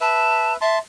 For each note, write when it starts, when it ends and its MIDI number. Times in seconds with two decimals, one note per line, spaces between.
0.01 0.57 71
0.01 0.57 76
0.01 0.53 81
0.61 0.77 76
0.61 0.79 81
0.61 0.79 84